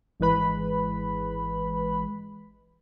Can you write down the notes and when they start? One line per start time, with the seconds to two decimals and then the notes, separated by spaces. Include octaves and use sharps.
0.20 G#1 E3 G#3 B4 B5